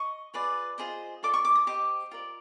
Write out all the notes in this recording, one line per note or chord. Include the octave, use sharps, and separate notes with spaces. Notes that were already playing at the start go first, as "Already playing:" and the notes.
Already playing: D#5 C#6
F4 G#4 B4 D5
F4 G#4 C5 D#5
F4 A4 D5 D6
C#6
D6
D#6
G4 C5 D#5 D6
F4 A#4 D5